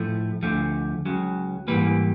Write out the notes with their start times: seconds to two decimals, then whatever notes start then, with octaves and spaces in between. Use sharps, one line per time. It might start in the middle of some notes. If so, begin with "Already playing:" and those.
Already playing: A2 F3 A3
0.43 D2 D3 F3 A3
1.06 C#2 C#3 F#3
1.68 G#2 E3 G3 A#3 B4